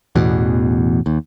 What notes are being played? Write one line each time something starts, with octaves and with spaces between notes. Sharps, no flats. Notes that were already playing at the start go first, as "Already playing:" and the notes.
A1 E2 B2
D#2